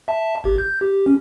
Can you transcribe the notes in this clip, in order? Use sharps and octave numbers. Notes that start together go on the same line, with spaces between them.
E5 A5
G#1 G4
G6
G4
C#4